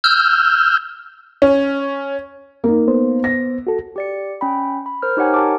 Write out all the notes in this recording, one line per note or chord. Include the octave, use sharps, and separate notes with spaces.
E6 F6 G6
C#4
A#3 D#4
B3 C5
A#6
F#4 A4
G4 D5 C#7
C#4 G5 B5
B5
A#4 C5 F6
D#4 G4 C#5 F#5 G#5
G4 A#4 A5 D6